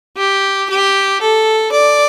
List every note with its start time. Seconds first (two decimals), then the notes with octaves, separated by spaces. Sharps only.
0.17 G4
0.69 G4
1.21 A4
1.72 D5